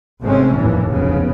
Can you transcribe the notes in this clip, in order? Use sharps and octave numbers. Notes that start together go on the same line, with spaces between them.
G#1 C3 G#3 A3 C4 C#4
F1 A#1 D#2 A2 E3
F1 B1 C#3 B3